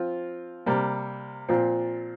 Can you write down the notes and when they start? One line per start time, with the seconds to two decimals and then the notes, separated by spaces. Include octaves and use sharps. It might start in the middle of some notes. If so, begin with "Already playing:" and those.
Already playing: F3 C4 F4
0.66 C3 G3 A#3
1.49 A#2 F3 C4